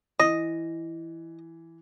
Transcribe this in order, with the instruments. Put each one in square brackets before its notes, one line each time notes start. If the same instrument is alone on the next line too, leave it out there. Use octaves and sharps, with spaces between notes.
[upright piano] E3 [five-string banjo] D#5